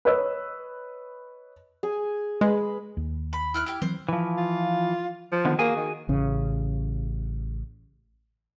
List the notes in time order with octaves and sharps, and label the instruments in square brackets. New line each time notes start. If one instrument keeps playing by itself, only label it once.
[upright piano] B4 C#5 D#5 E6
[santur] G#4 G#5
[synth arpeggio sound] G#3 [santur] B4
[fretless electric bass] D#2
[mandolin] B5
E4 F6 F#6
E4 G4
[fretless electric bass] E3 F#3 C4 [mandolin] C5
[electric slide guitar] E3 F3
[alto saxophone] F4
F3
[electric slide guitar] D3 D#3 B3
[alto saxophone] A#3 [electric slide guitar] F#4 G#4 G#5
[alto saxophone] D#3
[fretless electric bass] A1 C#3